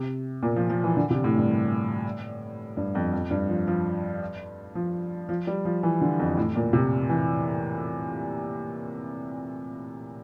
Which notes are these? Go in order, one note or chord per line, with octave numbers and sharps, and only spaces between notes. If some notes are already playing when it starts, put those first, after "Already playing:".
Already playing: C3
A#2
F3
F3
E3
D3
C3
A2
G2
G2
F2
F2
G2
F3
F3
F3
F3
G3
F3
E3
D3
F2
A2
A#2
C3
E3